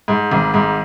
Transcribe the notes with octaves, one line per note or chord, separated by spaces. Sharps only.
G#2
G#1
G#2